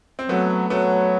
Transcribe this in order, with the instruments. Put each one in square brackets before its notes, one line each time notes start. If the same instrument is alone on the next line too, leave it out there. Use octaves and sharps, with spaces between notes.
[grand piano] C4
[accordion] F#3 [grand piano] A3 B3
[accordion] F#3 [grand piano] A3 B3